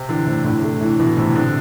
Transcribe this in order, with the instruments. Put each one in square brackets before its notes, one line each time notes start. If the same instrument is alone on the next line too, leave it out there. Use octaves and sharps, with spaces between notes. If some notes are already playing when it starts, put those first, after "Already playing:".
Already playing: [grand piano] C3
[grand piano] D3 [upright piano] E3
[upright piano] A2 [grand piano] C3
[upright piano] A2 [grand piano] D3
[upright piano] A3
[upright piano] A2 [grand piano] E3
[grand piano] B2 [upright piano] E3
[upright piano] A2 [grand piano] C3
[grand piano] E3
[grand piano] D3 [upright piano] C4